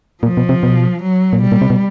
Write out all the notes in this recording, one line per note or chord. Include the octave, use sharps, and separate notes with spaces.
A#2 F3
B2
C3
B2
F#3
A#2
B2 G3
A#2
C3
B2